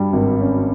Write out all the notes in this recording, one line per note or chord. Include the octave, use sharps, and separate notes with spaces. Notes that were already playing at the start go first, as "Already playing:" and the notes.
Already playing: G2 G3
G#1
C#4